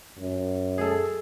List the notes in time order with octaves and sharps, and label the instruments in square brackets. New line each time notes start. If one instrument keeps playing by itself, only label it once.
[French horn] F#2
[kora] G#4 A4